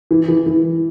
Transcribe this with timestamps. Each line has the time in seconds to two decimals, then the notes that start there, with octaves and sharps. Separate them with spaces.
0.11 E3
0.29 E3
0.46 E3